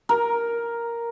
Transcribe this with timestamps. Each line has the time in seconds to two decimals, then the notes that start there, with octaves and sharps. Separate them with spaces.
0.09 A#4